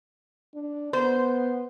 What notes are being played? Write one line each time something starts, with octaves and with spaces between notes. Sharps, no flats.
D4
B3 C5